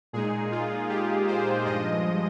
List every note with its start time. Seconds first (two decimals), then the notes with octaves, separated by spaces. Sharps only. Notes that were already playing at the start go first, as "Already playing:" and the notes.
0.13 A#2 G#3 D#4 G#4
0.51 F4
0.89 G4
1.27 C5
1.65 G2 F3 G#3 D#5